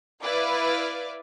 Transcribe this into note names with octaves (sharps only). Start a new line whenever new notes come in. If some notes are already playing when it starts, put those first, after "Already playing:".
E4 B4 D5 E5 F5 D6